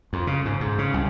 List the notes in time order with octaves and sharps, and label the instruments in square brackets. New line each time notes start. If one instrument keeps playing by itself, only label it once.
[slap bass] F2
C#3
G#2
G#2
C#3
C2